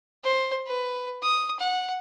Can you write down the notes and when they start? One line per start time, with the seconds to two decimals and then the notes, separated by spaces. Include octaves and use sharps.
0.24 C5
0.67 B4
1.22 D#6
1.60 F#5